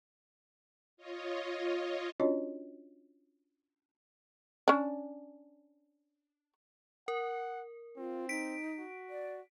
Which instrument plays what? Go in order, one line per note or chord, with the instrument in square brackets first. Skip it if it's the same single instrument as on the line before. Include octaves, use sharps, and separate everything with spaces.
[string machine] F4 C#5 D#5
[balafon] C#4 D4 F4 F#4 C#5 D#5
[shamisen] C#4 D4
[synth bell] A#4 [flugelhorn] F#5
[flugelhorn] C4 [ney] F4
[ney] D#4 [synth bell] B6 D7
[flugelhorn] F#4
[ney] D5